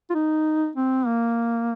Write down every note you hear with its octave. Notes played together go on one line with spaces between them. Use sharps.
F4
D#4
C4
A#3